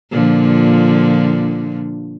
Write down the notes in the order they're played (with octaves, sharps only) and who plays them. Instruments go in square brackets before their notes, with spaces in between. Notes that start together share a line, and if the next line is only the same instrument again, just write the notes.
[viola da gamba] A#2 D3 F3